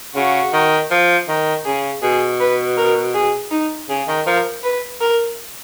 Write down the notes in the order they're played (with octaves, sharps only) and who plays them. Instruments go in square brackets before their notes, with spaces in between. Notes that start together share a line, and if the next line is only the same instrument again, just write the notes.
[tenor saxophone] C#3 [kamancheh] F#4
[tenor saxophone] D#3
F3
D#3
[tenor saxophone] C#3 [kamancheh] G#4
[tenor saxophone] B2 [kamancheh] G#4
[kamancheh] B4
A#4
G#4
D#4
[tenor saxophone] C#3 [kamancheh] G#4
[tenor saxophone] D#3
[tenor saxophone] F3 [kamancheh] A#4
[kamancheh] B4
A#4